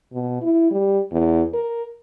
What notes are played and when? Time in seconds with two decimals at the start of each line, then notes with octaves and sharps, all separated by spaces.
0.13 B2
0.42 E4
0.71 G3
1.12 E2
1.54 A#4